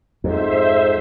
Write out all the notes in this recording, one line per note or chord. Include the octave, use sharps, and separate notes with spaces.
F2 G#2 C5 E5